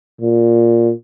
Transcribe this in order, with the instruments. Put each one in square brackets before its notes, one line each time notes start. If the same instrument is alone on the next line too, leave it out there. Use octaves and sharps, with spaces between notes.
[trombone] A#2